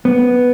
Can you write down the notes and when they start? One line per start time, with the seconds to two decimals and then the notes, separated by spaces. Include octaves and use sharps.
0.05 B3